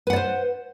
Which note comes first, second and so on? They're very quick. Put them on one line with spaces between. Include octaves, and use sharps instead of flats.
B4 F#5 D5 C5